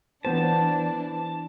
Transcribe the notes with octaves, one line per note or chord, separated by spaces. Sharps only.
E3 B3 D4 C5 A5